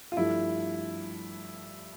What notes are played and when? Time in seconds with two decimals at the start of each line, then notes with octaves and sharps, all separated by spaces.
0.12 F4
0.17 G2 F3 A3 E4